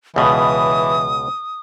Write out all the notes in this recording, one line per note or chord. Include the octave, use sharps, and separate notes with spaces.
C#2 B2 E3 D#6